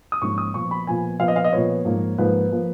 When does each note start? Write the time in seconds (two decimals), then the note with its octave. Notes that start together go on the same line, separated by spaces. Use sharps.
0.12 D#6
0.22 G#2 F3 A#3 C#4 C#6
0.38 D#6
0.54 A#2 F3 B3 C#6
0.71 B5
0.87 A#2 F3 B3 G#5
1.20 A#2 F3 B3 F5
1.28 D#5
1.36 F5
1.44 D#5
1.53 A#2 F3 B3 C#5
1.85 G#2 F3 A#3
2.18 G#2 F3 A#3 B4
2.52 F3 A#3